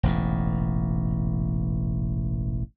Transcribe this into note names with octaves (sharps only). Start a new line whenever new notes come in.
E1 A1 G#2